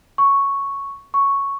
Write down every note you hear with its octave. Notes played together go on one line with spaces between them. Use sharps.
C#6
C#6